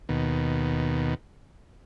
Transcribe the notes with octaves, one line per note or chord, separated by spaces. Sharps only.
D#2 B2